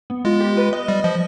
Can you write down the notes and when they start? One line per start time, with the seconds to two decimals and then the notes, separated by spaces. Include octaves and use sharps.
0.10 B3
0.25 G#3 F4
0.40 G4
0.57 B4
0.73 D#5
0.88 G3 D#5
1.04 F3 D#5